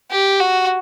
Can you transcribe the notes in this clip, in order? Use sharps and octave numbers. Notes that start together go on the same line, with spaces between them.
G4
F#4